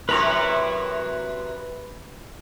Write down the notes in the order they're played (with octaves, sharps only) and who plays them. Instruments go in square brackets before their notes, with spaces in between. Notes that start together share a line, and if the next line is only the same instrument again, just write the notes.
[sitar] F#2 C3 E4 [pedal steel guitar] B4 A#5 C#6